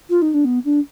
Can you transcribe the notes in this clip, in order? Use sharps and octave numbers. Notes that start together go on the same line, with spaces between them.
F4
D#4
D4
B3
D4